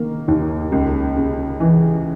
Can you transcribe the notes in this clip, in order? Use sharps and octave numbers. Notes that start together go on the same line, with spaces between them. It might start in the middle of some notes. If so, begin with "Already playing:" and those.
Already playing: D#3 A#3
D#2
C#2
C#3
E3